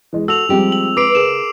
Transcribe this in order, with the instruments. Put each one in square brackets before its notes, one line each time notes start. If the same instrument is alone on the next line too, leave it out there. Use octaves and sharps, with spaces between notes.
[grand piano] E3 G#3
[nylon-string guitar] F#4 [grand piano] A4 [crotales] E6 F7 F#7
[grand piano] F3 G#3 C4 [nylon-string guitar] G3 G4
[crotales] F#7
[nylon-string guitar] B4 [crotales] D6 C7 D7
[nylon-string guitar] C#3 [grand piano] G#4 A#4 [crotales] E7